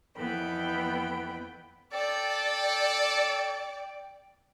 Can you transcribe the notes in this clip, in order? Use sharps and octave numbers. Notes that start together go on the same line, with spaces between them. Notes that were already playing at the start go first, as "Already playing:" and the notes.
F2 E3 B3 G5 B5
A4 D5 G5